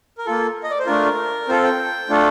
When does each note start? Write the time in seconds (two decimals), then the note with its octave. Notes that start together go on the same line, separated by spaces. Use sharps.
0.18 A#4
0.26 A#3 F4 A4
0.64 D#5
0.70 D5
0.79 C5
0.87 A3 D4 F4 A#4
1.48 C4 F4 A4 C5
1.63 G5
2.09 A3 D4 F4 A4